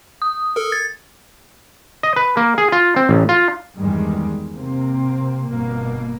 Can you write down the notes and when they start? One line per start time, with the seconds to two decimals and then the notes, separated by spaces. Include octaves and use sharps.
0.22 D#6
0.56 A4 A#4
0.72 G#6 A6
2.03 D#5
2.16 B4
2.37 A#3
2.58 G#4
2.72 F4
2.96 C4
3.09 A1
3.29 F4
3.77 E2 G2 D#3 G3 G#3
4.53 C3 A#3 C4
5.47 G1 B2 A#3